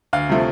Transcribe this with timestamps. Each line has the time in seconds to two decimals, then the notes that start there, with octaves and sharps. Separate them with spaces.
0.13 D2 F5
0.29 C3 F3 A3